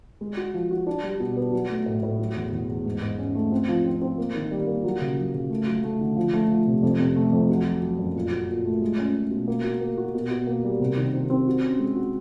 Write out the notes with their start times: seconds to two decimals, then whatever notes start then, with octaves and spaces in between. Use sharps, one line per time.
0.21 G#3
0.37 F#4
0.54 F3
0.71 F#4
0.87 D4
1.04 G3
1.20 B2
1.37 B3
1.53 F#3
1.70 A3
1.86 A2
2.03 A2
2.19 F#3
2.36 E2
2.52 E2
2.69 E2
2.86 G#2
3.02 G#2
3.18 C#4
3.35 A3
3.52 C4
3.68 F3
3.85 C4
4.02 C4
4.18 A#3
4.35 D#3
4.51 G3
4.67 A#3
4.84 F#3
5.01 C#3
5.18 F#3
5.34 C#3
5.50 A3
5.67 F#3
5.84 A3
6.00 D3
6.16 F3
6.33 A3
6.49 F3
6.67 C3
6.83 F2
6.99 C3
7.16 A3
7.33 F2
7.49 F#3
7.66 F#3
7.82 F#3
7.99 F#2
8.16 A#2
8.32 F#3
8.49 A#2
8.65 A3
8.81 G#3
8.98 C#4
9.15 C#4
9.31 B2
9.48 A#3
9.64 F#4
9.81 A#3
9.97 F#4
10.14 B2
10.31 B2
10.47 A#3
10.64 G3
10.80 C3
10.97 D#3
11.14 C4
11.30 C4
11.47 F#4
11.63 C#4
11.79 G#3
11.96 F#4